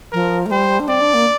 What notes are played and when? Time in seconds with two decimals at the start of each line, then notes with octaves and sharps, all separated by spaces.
0.12 F3 A#4
0.46 A3
0.51 G3 C5
0.80 D4
0.88 C4 D5
1.01 D4
1.14 A#3